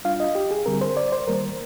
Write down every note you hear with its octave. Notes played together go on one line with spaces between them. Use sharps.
G3 D4 F4 F5
D#5
G4
G#4
D3 G3 C4 A#4
C5
D5
C5
D#3 G3 A#3 A#4